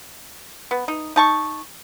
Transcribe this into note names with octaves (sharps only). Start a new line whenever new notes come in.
B3
D#4
D#4 A5 C#6